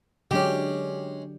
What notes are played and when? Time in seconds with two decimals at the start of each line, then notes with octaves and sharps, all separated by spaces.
0.31 D3 F#3 G#3 C#4 D4 G4